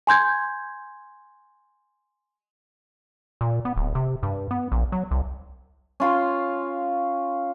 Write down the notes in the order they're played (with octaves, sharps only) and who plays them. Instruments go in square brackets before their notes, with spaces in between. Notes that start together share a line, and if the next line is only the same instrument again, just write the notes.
[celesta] G#5 C6 G6 G#6
[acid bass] A#2
B3
D1
C3
G2
B3
A#1
F#3
C2
[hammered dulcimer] C#4 F4 C6